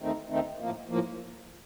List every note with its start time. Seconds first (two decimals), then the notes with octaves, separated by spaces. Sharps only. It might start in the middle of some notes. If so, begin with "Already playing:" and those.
0.01 D#2 D#3 A3 C4 D#4
0.29 D#2 D#3 A3 C4 D#4
0.60 A2 F3 A#3
0.89 A2 F3 A#3